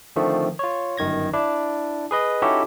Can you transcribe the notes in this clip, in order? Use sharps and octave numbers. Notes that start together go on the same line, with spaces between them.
D3 D#3 F3 A3 C4
F4 C#5
G1 F#2 D#3 G#6 A#6
D4 E4
G#4 B4 D#5
C#4 D#4 E4 F#4 G4 A4